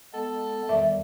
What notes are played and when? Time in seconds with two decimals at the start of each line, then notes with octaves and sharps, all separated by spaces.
0.14 G#3 B3 A4
0.69 E2 D#3 G3 E5